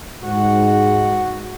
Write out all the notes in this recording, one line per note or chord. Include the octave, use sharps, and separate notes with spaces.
G#2 F#4